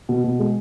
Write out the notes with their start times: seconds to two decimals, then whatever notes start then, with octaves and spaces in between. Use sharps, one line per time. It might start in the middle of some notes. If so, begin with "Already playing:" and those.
0.09 B2
0.24 B2
0.39 G#3